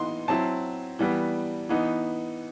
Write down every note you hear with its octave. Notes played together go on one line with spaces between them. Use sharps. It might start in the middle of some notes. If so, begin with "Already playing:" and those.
Already playing: E3 B3 D#4 C6
F#3 C4 E4 A5
E3 G3 B3
E3 B3 D#4